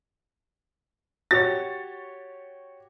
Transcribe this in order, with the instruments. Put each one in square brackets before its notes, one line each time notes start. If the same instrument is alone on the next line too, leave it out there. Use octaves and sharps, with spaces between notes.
[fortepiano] F#4 G4 C#5 [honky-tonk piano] A6